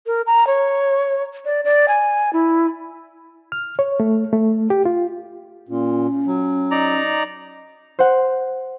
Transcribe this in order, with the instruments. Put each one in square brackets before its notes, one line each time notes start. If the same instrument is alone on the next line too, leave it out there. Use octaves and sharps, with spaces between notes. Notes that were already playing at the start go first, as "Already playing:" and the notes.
[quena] A#4
A#5
C#5
D5
D5
G#5
E4
[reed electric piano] F6
C#5
A3
A3
G4
F4
[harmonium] A#2 [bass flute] C#4
[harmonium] F#3
[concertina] D#4 D5 A#5
[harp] C5 F#5